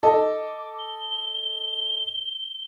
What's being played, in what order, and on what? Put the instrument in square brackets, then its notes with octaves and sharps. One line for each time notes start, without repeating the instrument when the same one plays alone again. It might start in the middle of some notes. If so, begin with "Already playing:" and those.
[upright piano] A4 D#5 [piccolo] D6
[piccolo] G7